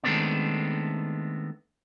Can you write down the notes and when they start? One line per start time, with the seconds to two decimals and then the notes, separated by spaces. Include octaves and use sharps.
0.04 D#3 G#3 A3 B3 C4 D4